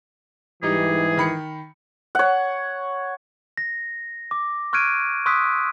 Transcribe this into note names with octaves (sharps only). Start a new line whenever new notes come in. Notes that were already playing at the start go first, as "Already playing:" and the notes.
G#2 E3 G3 D#4 G4 G#4
D#3 B5 C#7
C#5 F#5
A#6
D6
C#6 F6 F#6 G#6 D7 D#7
C6 C#6 D#6 E6 F#6 B6